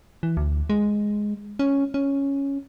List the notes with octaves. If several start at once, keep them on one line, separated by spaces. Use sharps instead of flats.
E3
D2
G#3
C#4
C#4